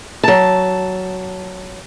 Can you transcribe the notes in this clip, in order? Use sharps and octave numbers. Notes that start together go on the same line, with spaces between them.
F#3 A5